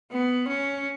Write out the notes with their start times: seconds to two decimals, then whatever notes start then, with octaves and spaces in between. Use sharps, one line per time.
0.12 B3
0.48 C#4